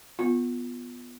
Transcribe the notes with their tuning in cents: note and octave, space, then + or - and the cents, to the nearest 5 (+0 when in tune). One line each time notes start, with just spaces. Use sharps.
B3 +0 F4 +0